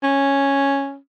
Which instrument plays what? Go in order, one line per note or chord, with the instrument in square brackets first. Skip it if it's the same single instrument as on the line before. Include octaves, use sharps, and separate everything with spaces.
[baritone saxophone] C#4